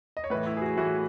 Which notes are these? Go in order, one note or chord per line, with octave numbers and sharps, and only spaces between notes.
D#5
C#5
A2 E3 B4
E4
G#4
F#4
A2 E3 F#4